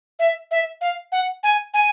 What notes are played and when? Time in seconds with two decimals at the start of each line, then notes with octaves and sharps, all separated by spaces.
0.19 E5
0.51 E5
0.81 F5
1.12 F#5
1.43 G#5
1.74 G#5